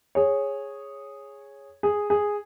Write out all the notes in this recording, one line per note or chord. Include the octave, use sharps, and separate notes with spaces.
G#4 C#5
G#4
G#4